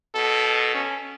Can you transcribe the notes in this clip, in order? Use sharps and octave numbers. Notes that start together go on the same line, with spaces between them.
B2 A4
C#4